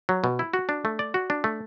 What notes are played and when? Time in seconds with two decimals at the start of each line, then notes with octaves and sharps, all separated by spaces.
0.09 F#3
0.24 B2
0.39 E4
0.53 F#4
0.69 D4
0.85 A3
0.99 D5
1.14 F#4
1.30 D4
1.44 A3